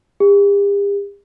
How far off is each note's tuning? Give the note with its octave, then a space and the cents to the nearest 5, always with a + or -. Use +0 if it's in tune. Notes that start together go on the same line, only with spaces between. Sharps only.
G4 +45